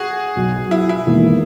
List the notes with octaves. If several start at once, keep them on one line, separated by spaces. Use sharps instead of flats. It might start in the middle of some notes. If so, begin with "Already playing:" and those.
Already playing: F#4 G#4
B1 B2 F#3
E4
E4
E1 E2 D#3 A#3